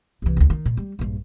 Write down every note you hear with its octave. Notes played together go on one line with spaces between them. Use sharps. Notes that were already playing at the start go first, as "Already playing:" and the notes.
C2 E3
D2 A2
D#3
A#2
G3
A#1 G2